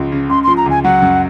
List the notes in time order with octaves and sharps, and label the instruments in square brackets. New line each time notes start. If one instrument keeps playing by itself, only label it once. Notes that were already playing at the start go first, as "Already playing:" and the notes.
Already playing: [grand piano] C#2 F3
C#3
[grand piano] C#2 [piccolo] C6
[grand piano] F3 [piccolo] C6
[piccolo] A#5
[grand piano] C#2 [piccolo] G#5
[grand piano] F#3 [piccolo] F#5
[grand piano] F#2